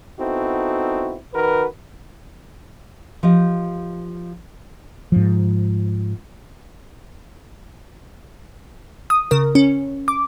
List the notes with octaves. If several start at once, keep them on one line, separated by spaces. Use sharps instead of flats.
B3 C4 D#4 E4 F#4 A4
D#3 F#4 A#4 B4
F3 G4 D#5
G#2 F3
D#6
C#3 A#4
C#4
D6